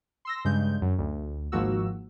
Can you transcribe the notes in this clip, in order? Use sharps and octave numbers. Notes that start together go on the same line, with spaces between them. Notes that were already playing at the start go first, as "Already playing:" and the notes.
C6 E6 A#6
G2 C#3 G#3 G6
F#2
D2
G#1 G#2 F3 A#3 F#4 E6